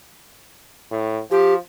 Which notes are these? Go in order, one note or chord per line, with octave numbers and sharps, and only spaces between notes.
A2
F3 G4